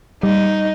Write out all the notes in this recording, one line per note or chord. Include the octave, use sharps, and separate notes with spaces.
G3 D#4